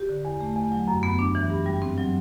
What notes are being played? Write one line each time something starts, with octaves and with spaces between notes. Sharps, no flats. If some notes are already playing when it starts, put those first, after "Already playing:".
Already playing: G4
D3
E2
A3
E2
F#3
F#2
B3
D4
E3
G2
G3
C4
F#3